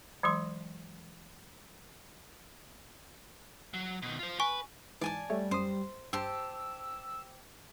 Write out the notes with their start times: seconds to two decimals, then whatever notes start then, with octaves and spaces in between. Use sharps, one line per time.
0.23 E3 F#3 G#3 C6
3.74 F#3
4.02 B2 D#3
4.19 F4 C5
4.40 B4 G#5 C#6
5.01 G#2 E3 D5 G#5 A5
5.30 G3 A3 C#5
5.51 F#2 C5 D#6
6.13 G2 G4 C5 A5 E6